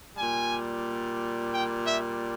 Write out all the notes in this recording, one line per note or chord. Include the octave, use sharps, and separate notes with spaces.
A#2 G3 G#5
G5
E5